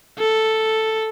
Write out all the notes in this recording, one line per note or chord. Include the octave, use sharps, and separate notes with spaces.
A4